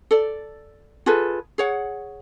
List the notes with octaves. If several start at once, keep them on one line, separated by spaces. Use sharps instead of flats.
A4 D5
F4 G#4 A4 B4
G#4 C#5 F#5